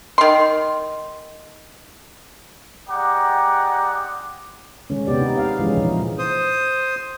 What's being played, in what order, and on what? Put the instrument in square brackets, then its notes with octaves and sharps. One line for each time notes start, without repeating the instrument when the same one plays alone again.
[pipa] D#3 C6
[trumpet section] G#3 G4 D5 F#5 A#5 D6
[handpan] D#3 G#3 C#4
C3 B3 G4 D5
D#4
F5
E3 F3 G#3 C#4 D#4
A#2 E3 F3 D#4
[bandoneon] C5 D#6